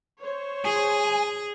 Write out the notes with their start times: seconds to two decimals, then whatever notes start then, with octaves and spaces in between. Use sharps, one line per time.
0.22 C5 C#5
0.65 G#4 G#5